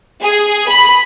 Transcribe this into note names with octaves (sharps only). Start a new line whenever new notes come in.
G#4
B5